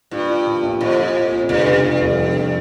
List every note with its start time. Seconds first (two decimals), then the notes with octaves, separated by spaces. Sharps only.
0.11 G2 A#2
0.29 F3
0.47 A#2
0.63 A#1
0.81 F2 A#2
0.98 F3
1.15 F3
1.32 A#1
1.48 F1 G2
1.66 C#3
1.83 F2
2.01 F1
2.18 F2
2.35 F2